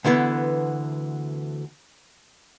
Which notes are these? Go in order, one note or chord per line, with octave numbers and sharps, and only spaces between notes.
D2 D3 E3 B3